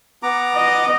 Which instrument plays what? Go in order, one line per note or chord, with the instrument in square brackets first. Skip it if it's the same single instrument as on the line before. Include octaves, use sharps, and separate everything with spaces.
[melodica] B3 A#5 D6
[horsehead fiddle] D#5